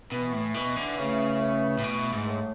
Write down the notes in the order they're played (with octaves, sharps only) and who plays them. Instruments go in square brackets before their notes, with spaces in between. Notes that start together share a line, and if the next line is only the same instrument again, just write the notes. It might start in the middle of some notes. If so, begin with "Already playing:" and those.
[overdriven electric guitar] B2 [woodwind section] E3
[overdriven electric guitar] A2
[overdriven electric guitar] B2 [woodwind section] E3
[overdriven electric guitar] D3
[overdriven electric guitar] C#3 [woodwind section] A3
[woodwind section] E3
[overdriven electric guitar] A2
[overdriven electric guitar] B2 [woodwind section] A3
[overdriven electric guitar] G#2
[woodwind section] A2